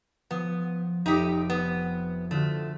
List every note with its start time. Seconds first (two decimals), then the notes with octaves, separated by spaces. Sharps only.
0.31 F3 B3
1.06 F1 F2 D#4 G4 C#7
1.50 B3
2.31 D3 A3 F4 F#4